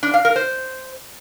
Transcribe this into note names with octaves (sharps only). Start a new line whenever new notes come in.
D4
F5
A#4
C5